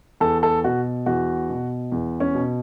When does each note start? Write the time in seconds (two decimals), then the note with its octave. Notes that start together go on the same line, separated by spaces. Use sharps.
0.20 E2 A4
0.43 A4
0.64 B2 F#4
1.06 E2 F#4
1.50 B2
1.92 E2
2.20 C#4
2.34 B2